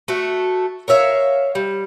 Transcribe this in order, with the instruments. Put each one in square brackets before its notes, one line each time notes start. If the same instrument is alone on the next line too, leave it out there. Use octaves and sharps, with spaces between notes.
[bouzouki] A3 F#4 E5
A#4 C#5 E5 F5
G3